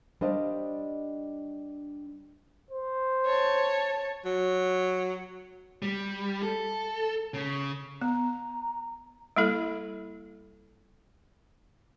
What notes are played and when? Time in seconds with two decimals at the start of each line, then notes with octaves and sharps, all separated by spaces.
0.21 G3 D4 C5 D#5 F5
2.71 C5
3.25 C#5 A5
4.25 F#3
5.82 G3
6.43 A4
7.34 C#3
8.01 B3 A#5
9.36 G3 A#3 E4 A4